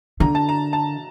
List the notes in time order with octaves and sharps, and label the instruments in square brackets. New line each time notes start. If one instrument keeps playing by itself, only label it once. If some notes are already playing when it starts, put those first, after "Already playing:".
[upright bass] D3 [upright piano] A#5
[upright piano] A5
A#5
A5